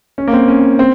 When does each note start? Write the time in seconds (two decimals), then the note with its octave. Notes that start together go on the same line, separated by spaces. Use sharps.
0.18 C#4
0.27 A#3
0.33 C4
0.48 C#4
0.79 C4